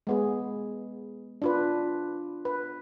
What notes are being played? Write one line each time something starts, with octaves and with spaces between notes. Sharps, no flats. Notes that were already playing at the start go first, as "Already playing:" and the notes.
G#3 B3 G#4
D4 F4 B4
B4